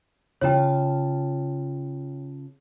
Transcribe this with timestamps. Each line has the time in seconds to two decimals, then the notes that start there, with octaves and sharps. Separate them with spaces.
0.41 C#3 F4 C#5 G5 A5